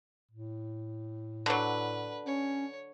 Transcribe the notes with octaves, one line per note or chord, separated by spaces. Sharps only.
A2
D3 F#3 B4 A5
C#4 C#5